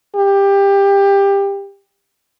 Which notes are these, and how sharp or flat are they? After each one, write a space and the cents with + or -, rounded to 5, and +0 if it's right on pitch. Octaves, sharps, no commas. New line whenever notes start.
G4 +20